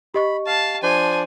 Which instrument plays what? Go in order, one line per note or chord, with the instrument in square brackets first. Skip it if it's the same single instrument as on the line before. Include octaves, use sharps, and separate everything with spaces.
[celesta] G4 D#5 C#6 [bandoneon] B5
[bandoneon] F5 F6 [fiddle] A5
[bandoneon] F3 D4 D5 [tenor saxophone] C5 [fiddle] G#5